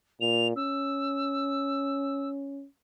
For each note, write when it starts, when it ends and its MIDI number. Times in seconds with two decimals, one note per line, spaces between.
0.21 0.56 46
0.21 0.48 101
0.56 2.65 61
0.56 2.29 88